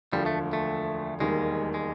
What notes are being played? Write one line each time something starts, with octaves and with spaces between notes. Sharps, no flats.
E1 D2 D3 F3 G3
A3
A3
E1 D#2 D#3 G3 G#3 A#3
G#3